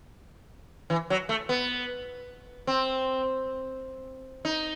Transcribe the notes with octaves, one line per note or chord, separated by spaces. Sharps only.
E3
F#3
A3
B3
C4
D#4